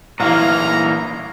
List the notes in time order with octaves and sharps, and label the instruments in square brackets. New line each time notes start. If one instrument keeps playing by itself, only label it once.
[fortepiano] A1 A#3 F5 [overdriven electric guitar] A#2 E3 [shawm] A#5 [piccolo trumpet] F6